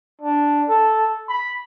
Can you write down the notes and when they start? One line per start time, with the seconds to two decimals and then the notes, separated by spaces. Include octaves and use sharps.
0.22 D4
0.69 A4
1.28 B5